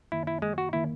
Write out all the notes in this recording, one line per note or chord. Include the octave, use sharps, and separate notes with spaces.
F#2 D#3 A#3 E4
E4
G#3
F#4
D#3 A#3 E4